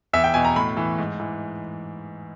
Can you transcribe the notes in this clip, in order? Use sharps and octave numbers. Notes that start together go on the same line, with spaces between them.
E2 E5
G5
B2 G#5
A#5
A2 B5
E3
G#2
E3